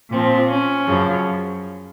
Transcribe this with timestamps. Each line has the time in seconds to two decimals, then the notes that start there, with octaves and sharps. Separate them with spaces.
0.11 A#2 F3 C4
0.49 C#4
0.87 F#2 C#3 F3